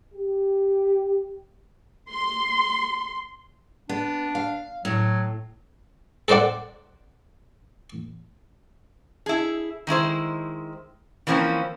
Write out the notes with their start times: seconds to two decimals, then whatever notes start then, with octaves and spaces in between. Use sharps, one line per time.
0.14 G4
2.10 C6
3.89 B3 D4
4.35 F5
4.85 A2 F#3
6.28 A4 A#4 C5 D5 F#5
9.26 E4 G#4
9.87 D#3 G#3 E4 C5
11.27 E3 F3 A#3 C4 C#4